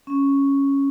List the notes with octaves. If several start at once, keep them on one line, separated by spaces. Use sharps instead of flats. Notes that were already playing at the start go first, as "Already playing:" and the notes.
C#4